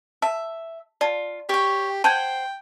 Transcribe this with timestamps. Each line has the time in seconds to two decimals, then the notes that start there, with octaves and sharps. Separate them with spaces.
0.22 E5 A5
1.01 F4 D5 A5
1.49 G4 C#5 G5
2.04 C5 F#5 G5 A5 G6 G#6